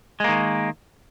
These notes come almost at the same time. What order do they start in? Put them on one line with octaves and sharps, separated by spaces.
G#3 A#3 D#3